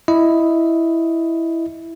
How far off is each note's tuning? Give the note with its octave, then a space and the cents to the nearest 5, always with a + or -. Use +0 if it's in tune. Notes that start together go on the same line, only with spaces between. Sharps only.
E4 +0 D#5 +0